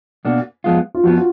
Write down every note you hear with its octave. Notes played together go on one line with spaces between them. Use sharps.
B2 A#3 D4 F#4
F2 F3 G#3 B3 F4
F4
F2 F3 B3 F#4
F4